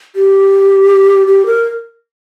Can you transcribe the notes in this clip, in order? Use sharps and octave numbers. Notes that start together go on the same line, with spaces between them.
G4
G4
A#4